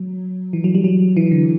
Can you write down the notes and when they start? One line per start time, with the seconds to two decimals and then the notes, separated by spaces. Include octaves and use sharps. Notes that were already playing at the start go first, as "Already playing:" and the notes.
Already playing: F#3
0.53 E3
0.64 F#3
0.75 G3
0.84 F#3
1.17 E3
1.31 D3